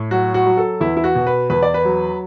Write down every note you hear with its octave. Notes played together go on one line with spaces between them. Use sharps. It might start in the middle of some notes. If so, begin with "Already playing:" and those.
Already playing: A2
F#3 F#4
F#4
F#3
A4
E2 E4
E4
F#4
B2
B4
E2 B4
D5
B4
F#3